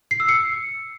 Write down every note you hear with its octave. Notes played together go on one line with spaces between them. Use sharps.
C7
E6
C#7